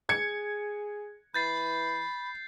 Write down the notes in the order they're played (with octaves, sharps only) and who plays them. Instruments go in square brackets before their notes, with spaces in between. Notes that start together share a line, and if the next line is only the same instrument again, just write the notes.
[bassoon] G#4 [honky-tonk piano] G#6 C#7
[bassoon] E3 [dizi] B5 [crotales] G6 A6 C7